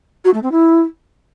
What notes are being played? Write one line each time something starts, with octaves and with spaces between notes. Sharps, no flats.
F#4
A3
C4
E4